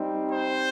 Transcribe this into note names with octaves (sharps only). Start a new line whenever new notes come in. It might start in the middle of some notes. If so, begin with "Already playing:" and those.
Already playing: G3 C4 D#4
C5